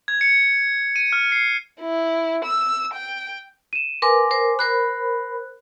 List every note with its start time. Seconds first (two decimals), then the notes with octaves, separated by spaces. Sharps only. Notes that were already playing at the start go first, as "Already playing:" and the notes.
0.08 G#6
0.21 C#7
0.96 D#7
1.13 F6
1.32 C7
1.81 E4
2.45 E6
2.94 G5
3.73 D#7 E7
4.02 A#4 B4 G#5 C6 D6
4.31 A#4 C5
4.59 A#4 C5 B5 F#6